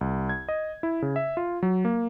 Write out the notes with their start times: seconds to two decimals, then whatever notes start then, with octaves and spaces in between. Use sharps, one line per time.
0.01 C2
0.29 G#6
0.49 D#5
0.83 E4
1.02 C#3
1.16 E5
1.37 F4
1.63 F#3
1.85 A#3